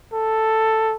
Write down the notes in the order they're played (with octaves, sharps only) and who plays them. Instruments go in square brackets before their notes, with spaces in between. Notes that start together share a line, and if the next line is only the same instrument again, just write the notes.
[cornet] A4